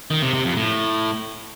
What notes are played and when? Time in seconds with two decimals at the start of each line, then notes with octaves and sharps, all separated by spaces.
0.11 D#3
0.22 C3
0.34 C3
0.45 F2
0.57 A2